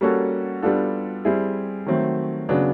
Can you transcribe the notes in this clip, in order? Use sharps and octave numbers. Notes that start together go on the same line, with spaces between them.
G3 A#3 C#4 F#4 A4
G3 B3 D4 F4 A4
G3 C4 E4 G#4
D#3 F#3 A3 C4
C#3 F#3 B3 D4